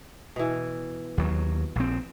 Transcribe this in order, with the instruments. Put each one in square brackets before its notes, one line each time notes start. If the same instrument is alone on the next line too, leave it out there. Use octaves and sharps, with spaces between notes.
[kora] B2 E3
[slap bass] D#2 F#3
A#1 C4